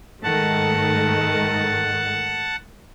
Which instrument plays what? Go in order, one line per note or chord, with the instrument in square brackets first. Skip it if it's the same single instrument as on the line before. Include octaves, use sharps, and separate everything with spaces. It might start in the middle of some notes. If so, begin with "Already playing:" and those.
[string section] G#2 D#3 A3 [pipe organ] F#5 A5